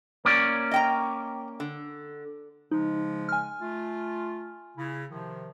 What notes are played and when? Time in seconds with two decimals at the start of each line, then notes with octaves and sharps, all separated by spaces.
0.25 A#3 C#4 D5
0.71 D#5 G5 A#5
1.60 D3
2.72 C#3 F3 G#3 D#4
3.29 G#5 F6
3.60 A3 F4
4.76 C#3 E4
5.10 C3 D#3 F3